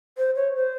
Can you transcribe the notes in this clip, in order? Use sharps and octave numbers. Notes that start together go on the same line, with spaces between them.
C5
C#5
C5